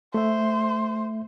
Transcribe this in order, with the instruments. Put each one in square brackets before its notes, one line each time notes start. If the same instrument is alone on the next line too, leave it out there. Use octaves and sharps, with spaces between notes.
[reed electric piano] A3 E5 [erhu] C5